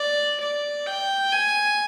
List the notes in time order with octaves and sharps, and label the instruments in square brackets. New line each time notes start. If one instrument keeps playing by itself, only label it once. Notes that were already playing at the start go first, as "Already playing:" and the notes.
Already playing: [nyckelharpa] D5
D5
G5
G#5